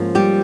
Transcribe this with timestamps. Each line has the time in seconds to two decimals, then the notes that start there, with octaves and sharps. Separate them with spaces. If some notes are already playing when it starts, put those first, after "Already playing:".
Already playing: G#2 F3 A#3 C#4
0.15 G3 G4